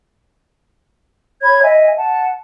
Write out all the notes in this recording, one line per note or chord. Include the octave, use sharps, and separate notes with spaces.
C#5 B5 G#6
D#5 E5 G#5
F#5 A5